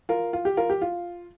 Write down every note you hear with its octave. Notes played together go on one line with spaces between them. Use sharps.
F4 A#4
F4
G4
F4 A#4
G4
F4